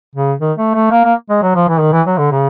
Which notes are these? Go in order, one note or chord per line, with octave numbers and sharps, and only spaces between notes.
C#3
D#3
A3
A3
A#3
A#3
G#3
F#3
F3
E3
D#3
E3
F#3
D3
C#3